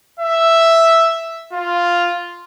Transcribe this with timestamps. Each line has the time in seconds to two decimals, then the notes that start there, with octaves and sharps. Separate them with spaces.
0.20 E5
1.53 F4